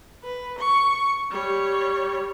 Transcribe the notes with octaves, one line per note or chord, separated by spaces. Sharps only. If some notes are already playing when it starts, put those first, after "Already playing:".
B4
C#6
G3 C#5